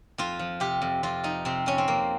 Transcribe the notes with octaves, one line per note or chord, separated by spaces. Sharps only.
F2 F4
F3
C3 G4
F2
F2 F4
F3 D#4
C3 C4
F2 C#4
C4
F2 A#3